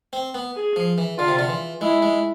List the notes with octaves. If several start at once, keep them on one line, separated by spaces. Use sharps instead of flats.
C4
B3
G#4
F3
E3
D3 F4
C3
D3
E3
G#3 E4
G#3